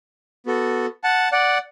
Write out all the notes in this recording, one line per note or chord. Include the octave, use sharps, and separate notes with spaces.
B3 F#4 A4
F#5 A5
D5 F#5